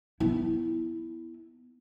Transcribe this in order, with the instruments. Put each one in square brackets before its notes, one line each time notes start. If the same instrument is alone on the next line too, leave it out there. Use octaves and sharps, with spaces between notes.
[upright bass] B3 E4